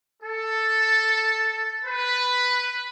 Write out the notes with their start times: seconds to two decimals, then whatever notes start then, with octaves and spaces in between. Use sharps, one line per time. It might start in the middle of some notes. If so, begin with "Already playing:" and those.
0.23 A4
1.85 B4